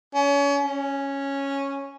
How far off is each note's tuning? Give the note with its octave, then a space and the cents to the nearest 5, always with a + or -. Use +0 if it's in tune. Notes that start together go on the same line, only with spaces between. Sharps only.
C#4 +35
C#4 -5